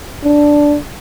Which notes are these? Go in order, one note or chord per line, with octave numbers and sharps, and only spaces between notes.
D4